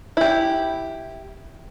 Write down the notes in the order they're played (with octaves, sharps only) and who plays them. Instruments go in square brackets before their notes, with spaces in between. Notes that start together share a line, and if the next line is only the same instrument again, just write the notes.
[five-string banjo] E4 G4